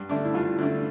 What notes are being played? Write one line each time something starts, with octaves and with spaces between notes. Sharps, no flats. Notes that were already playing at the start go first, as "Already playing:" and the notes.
Already playing: G2
D3 A3 D4
E4
G2 F4
D3 A3 D4